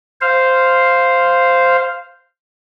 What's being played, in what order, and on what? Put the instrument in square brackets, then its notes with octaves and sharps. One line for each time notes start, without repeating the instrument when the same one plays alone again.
[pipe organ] C5 F5